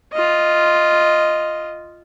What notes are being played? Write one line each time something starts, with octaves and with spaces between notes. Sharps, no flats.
F4 D#5